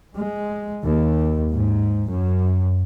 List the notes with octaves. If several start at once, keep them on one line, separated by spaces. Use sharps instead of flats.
G#3
D#2
G#2
F#2